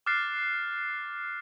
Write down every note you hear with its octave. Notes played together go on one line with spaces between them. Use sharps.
D6 F6 F#6 A6 C7